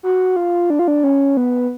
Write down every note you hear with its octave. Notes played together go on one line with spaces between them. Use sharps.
F#4
F4
D4
F4
D4
C#4
B3